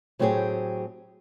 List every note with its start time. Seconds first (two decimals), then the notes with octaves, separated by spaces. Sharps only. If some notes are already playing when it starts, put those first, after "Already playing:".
0.19 A2 F#3 C4 D4 G4 G#4